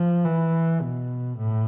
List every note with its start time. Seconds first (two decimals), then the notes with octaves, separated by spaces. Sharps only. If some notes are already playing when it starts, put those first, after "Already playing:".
Already playing: F3
0.24 E3
0.81 B2
1.38 A2